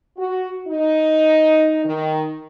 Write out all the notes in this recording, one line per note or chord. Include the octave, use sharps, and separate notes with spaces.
F#4
D#4
D#3